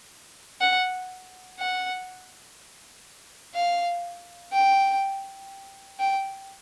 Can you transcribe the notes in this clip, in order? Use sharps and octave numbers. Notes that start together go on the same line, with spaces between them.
F#5
F#5
F5
G5
G5